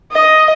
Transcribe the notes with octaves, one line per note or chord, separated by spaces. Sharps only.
D#5